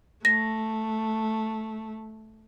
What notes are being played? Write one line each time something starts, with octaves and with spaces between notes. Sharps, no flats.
A3 A#6